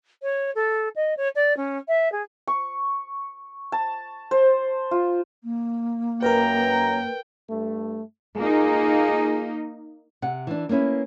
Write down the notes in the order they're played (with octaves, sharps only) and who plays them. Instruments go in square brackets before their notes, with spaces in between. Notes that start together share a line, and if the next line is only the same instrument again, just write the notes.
[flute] C#5
A4
D#5
C#5
D5
C#4
E5
G#4
[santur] C#6
A5
C5
F4
[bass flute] A#3
[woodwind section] F#2 A#5 [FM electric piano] A#4 B4 [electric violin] G5
[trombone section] G2 A3
[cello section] A#3 D#4 [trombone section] F4 G#4
[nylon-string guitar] C3 F#5
E3 D4
A#3 B3 C#4 E4 B4